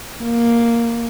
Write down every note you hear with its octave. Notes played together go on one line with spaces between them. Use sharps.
A#3